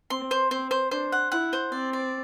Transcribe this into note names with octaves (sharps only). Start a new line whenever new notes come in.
C4 C6
C5
C4 C5
C5
D4 C5
F#5
E4 F#5
C5
C4 D5
D5